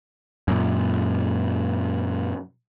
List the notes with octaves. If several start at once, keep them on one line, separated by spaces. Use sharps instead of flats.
F#2 A#2